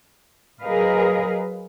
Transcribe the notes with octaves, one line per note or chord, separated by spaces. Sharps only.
F#3 G#4 A#4 B4 D#5 F5